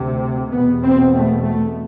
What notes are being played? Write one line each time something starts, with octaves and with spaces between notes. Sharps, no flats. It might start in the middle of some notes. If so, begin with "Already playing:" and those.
Already playing: D2 C3
E2 B2 B3
C4
A3
A3